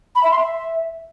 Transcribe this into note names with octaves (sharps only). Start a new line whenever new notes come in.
B5
E5
C6
E5